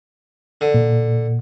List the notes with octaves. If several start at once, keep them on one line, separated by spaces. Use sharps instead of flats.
D3
A#2